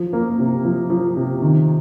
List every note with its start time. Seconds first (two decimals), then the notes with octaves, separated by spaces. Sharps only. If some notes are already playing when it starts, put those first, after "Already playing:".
Already playing: F3
0.13 A#3
0.39 C3
0.65 F3
0.90 F3
1.16 C3
1.42 D#3